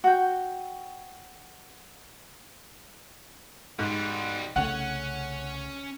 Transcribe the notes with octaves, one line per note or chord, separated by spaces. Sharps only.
F#4 G5
G#2 B2 G3
C2 C#3 A3 C#4 C#5 F#5